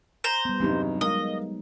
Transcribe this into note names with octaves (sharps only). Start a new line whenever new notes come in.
C5 A#5
G3 B3
E2 G2 C3 F#3 D#4
G#3 A#4 D#5 F5